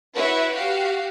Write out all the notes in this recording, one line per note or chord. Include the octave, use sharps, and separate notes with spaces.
E4 F#4 B4 C#5 E5
F#4 G4 F5